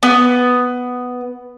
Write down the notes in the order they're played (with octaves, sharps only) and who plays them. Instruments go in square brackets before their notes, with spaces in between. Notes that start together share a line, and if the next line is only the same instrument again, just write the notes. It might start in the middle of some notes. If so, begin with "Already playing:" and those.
[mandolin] B3